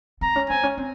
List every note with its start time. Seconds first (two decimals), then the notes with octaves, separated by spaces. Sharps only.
0.21 C4 A#5
0.36 C#4
0.49 C4 G#5
0.63 C#4
0.78 C4